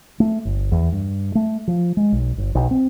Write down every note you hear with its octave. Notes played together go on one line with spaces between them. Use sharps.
A3
G1
E2
G2
A3
F3
G#3
B1
G1
B1
C4